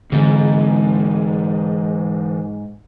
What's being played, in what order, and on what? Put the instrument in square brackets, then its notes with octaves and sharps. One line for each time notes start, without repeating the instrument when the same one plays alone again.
[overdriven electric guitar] G#2 [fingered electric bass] D3 E3 C4